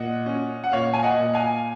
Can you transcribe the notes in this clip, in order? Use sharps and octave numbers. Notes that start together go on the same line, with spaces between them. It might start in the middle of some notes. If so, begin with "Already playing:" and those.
Already playing: A#2 D#5 F#5
C#4
F#5
A#2 C#5 F5
G#5
D#5 F#5
A#2
F5 G#5